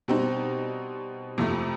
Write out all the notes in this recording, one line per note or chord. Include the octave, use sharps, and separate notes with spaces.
B2 G3 C4 D#4
F2 C3 F3 A3